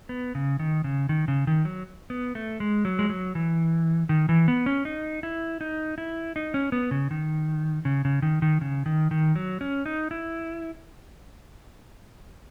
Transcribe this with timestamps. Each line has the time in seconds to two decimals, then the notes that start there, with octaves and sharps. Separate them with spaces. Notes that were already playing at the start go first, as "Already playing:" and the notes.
0.09 B3
0.35 C#3
0.59 D#3
0.84 C#3
1.09 D#3
1.28 C#3
1.47 D#3
1.65 F#3
2.10 B3
2.35 A3
2.60 G#3
2.85 F#3
2.99 G#3
3.10 F#3
3.35 E3
4.09 D#3
4.29 E3
4.48 B3
4.66 C#4
4.85 D#4
5.23 E4
5.61 D#4
5.98 E4
6.36 D#4
6.54 C#4
6.72 B3
6.91 C#3
7.11 D#3
7.85 C#3
8.05 C#3
8.22 D#3
8.42 D#3
8.61 C#3
8.86 D#3
9.11 D#3
9.36 F#3
9.61 C#4
9.86 D#4
10.11 E4